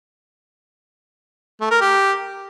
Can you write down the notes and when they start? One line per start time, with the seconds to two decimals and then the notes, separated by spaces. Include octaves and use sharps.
1.61 A3
1.71 A#4
1.81 G4